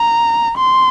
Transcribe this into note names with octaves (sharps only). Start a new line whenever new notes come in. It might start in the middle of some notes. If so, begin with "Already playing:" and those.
Already playing: A#5
C6